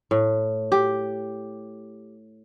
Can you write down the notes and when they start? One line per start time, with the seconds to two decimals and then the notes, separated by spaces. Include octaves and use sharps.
0.11 A2
0.72 G4